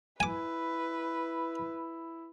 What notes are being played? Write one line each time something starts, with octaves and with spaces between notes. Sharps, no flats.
E4 B4 G#5 D6